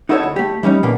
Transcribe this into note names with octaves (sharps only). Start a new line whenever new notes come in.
D#4 E4 F#4 A4 A#4 C#5
D2
A3 G4
E3 G3 C#4 D#4
A#2 D3 A#3 B3